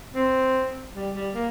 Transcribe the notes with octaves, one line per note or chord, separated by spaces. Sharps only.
C4
G3
G3
A#3